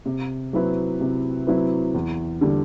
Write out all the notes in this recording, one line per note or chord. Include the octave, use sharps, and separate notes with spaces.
C3
F#3 C4 E4 B4
C3
F#3 C4 E4 B4
E2
D3 G3